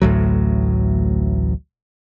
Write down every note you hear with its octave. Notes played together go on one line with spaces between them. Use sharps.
A1 D2 A2 F#3